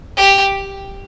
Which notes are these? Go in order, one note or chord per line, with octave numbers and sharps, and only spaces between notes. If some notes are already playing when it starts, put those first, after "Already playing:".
G4